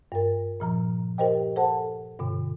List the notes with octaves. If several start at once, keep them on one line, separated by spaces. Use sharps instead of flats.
G2 A#4
A#2 F3 A#5
G4 A#4 C5 D#5 G5
A4 C5 F#5 A5
G2 B2 D3